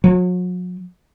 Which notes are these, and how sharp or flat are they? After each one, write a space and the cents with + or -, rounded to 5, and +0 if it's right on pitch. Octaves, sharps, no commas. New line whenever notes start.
F#3 -40